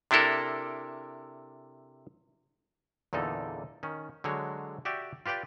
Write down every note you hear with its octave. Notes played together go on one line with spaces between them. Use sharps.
C3 D4 E4 A4 A#4
E2 A#2 D3 D#4 A4
D#3 C#4
D3 F#3 G#3 C#5
F#4 G4 D5 E5 G5
F4 G4 B4 D5 G5